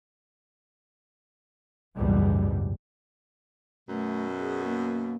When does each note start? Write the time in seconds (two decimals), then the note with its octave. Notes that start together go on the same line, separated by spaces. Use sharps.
1.97 F#1 C#2 G#2 B2 E3 G3
3.88 F#2 B2 A3
4.38 G#4
4.65 A#3